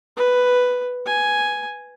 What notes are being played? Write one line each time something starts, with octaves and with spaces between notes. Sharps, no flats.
B4
G#5